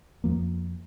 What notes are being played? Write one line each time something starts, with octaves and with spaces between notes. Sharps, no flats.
F2 F3 A#3